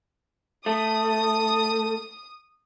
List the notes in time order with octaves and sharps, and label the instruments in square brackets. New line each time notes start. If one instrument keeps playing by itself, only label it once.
[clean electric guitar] A3 [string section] D#6